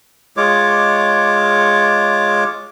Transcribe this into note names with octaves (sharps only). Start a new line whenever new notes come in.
G#3 F4 C#5 D6